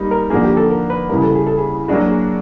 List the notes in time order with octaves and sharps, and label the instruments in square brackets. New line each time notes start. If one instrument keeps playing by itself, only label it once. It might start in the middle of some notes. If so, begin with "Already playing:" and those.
Already playing: [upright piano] G3 A#3 D#4
[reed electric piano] A#4
[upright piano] D3 F3 A#3 [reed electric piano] G#4
[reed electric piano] G4
A4
A#4
B4
[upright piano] C#3 E3 G3 [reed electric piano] A#4
[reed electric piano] A4
G#4
A4
G#4
[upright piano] F#3 A#3 D4 F#4 [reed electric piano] G#4
[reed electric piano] G#4